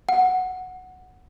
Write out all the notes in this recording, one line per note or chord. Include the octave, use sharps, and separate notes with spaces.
F#5